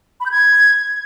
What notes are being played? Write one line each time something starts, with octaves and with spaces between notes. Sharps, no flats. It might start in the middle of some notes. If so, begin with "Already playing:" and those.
B5
G6
G#6